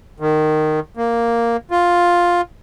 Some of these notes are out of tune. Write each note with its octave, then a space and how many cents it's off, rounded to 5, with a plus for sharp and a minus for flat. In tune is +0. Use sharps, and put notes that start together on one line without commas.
D#3 -15
A#3 +0
F4 +5